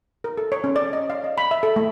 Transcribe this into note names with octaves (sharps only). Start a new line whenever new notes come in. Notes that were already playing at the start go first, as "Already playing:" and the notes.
A#4
A4
C#5
C#4
D5
D#5
F5
D#5
B5
E5
A4
A3